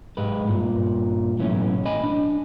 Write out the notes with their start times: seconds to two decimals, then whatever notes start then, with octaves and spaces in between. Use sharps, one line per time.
0.17 G#2 G#3 G4 B4
0.48 G2 A#2
1.39 B1 A2 E3 C#4
1.85 D#5 G#5 B5
2.04 D4